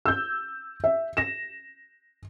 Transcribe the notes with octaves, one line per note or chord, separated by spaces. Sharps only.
E6 G6
E5
A#6 E7